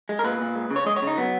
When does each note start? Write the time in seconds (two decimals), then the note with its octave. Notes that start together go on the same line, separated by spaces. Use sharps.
0.09 G#3
0.19 A#4
0.24 A#2 B4
0.41 A#2
0.55 G#3
0.70 C#3
0.76 C#5
0.86 G#3 D#5
0.96 C#5
1.02 C#3
1.07 D#4
1.17 F#3 B3